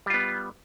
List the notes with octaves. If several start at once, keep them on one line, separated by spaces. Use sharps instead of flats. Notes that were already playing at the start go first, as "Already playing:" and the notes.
G3 B3 F4